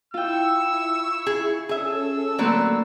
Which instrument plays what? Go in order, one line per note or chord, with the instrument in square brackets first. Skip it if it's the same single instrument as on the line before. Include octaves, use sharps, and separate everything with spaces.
[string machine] E4 C#6 [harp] F4 G5 [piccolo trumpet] E6
[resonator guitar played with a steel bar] G#4
[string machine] C#4 A4 [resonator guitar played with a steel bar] G#4 E5 [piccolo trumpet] E6
[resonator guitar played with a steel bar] D3 F#3 C4 [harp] A3 A#3 B4